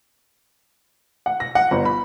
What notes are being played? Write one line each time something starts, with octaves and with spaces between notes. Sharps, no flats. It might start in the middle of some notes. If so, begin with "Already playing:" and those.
F#5
A#6
F#5
G1
B5